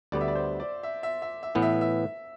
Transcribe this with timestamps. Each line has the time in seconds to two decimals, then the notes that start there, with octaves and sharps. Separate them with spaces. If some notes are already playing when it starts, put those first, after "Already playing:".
0.12 D2 D3 G3 B3 D5
0.21 E5
0.28 D5
0.35 C5
0.60 D5
0.83 E5
1.03 E5
1.22 E5
1.43 E5
1.55 A2 E3 B3
1.62 E5
1.81 E5